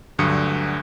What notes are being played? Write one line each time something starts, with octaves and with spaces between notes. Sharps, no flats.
D2 G2 D3 F#3 D#6 C#7